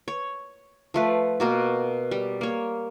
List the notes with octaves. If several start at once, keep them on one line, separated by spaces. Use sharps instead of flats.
C#5
F3 A3 B4
B2 A#3 F#4
G3
A#3 C#5